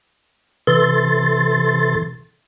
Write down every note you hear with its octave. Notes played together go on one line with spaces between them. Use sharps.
C3 E3 A4 C6 A6